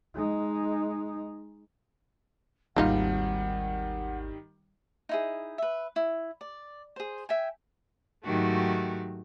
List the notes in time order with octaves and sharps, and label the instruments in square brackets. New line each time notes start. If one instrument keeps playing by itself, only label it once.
[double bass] G#3 D#4
[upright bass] G#1 D#2 [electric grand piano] D#3 G3 [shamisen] A#3 D#4 F4 [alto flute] F#5
[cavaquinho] D#4 E4 G#4
B4 E5
E4
D5
G#4 C5
E5 G5 G#5
[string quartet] G#2 D#3 F#3 A3 F#4 G4